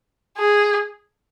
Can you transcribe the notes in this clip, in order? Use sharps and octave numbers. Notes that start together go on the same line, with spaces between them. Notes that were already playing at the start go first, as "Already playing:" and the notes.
G#4